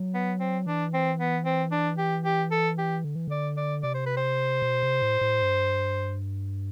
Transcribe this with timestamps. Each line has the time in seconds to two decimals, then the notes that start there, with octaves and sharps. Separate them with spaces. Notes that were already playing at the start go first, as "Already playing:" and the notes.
Already playing: F#3
0.14 B3
0.40 C4
0.66 E3 D4
0.94 C4
1.20 B3
1.45 C4
1.72 D4
1.98 G4
2.25 G4
2.51 A4
2.78 G4
3.05 D3
3.15 E3
3.28 D3 D5
3.57 D5
3.83 C3 D5
3.94 C5
4.06 B4
4.17 C5
4.62 B2
4.83 C3
5.02 A2
5.21 A2
5.42 G2